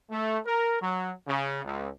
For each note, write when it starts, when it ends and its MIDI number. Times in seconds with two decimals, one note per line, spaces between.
0.11 0.39 57
0.46 0.77 70
0.81 1.11 54
1.27 1.63 49
1.65 1.89 37